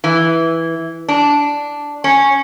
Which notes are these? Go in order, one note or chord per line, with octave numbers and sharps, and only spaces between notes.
E3
D4
C#4